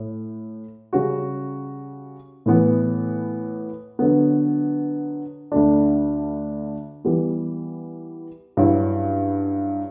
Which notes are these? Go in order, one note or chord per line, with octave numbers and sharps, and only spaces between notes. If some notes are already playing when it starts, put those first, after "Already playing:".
Already playing: A2
C#3 G3 C#4 F#4
A2 E3 B3
D3 F#3 B3
D2 D3 A3 D4
E3 G3 B3
G2 F#3 C#4 E4